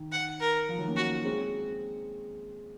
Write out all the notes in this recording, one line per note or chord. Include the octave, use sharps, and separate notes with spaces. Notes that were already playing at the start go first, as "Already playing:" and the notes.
Already playing: D#3
F#5
A#4
F3
D#3 F#3
A#3 C#4
F#4
G#3 C4